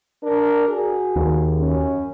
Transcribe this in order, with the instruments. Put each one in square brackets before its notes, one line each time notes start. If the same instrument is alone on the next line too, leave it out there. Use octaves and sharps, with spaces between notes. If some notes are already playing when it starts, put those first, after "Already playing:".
[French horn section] D4 A#4
F#4 G#4
[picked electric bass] D#2
[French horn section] F#2 C#4